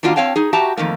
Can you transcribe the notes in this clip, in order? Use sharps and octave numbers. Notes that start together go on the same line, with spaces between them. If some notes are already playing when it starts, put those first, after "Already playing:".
D#3 A#3 D4 F4 F#4
C4 C#5 F5 G5 A5
D#4 G#4
F#4 G4 E5 A5 A#5
F2 D#3 A3 A#3